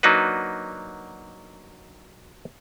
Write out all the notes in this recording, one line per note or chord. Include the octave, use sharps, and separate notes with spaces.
F#3 A#3 D4 D#4 F#4 B4